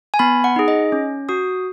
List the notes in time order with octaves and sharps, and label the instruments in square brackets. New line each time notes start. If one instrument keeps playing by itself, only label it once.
[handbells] G#5
B3 B5
F#5
D#4 G#4
D#5
C#4
F#4 D#6